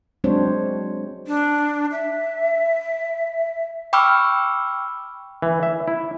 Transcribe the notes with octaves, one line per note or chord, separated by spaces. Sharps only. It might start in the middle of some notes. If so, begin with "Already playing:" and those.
F#3 G#3 C4 D4 C5 C#5
D4
E5
G5 B5 C#6 D6 E6 F6
E3
E5
E4